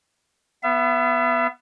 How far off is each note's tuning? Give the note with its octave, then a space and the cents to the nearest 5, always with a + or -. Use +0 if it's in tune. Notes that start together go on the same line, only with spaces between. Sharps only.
B3 +0 E5 +35